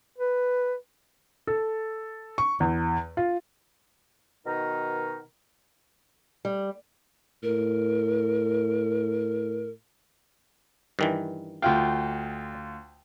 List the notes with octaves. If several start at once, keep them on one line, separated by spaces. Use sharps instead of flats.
B4
A4
C#6
E2
F4
B2 D#3 D#4 A#4
G3
A2 A#4
G2 D#3 E3
D2 F4 F5 G5